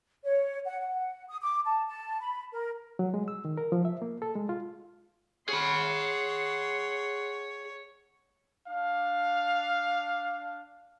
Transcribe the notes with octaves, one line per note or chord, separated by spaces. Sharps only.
C#5
F#5
F#5
D#6
D6
A5
A5
B5
A#4
F#3
G#3
E6
D#3
A#4
F3
E5
A#3
A4
G#3
F4
G#4 C#5 F#5 B5 C6
D4 F5